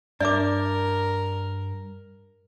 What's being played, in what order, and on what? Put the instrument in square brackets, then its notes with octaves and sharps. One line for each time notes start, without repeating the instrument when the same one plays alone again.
[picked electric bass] G2 [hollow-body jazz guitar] D4 [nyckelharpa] A#4 [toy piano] D5 E5 D6